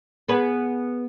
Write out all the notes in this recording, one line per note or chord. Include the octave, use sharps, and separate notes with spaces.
B3 G#4 B4